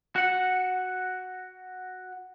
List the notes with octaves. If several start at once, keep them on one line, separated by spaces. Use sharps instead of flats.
F#4 F#5